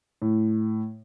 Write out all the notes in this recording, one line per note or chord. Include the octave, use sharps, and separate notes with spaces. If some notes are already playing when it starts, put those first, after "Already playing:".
A2